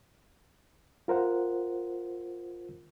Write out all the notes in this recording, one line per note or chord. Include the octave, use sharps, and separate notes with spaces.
F4 A#4 C5 F#5